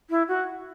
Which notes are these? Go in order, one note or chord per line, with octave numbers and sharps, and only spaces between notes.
E4
F#4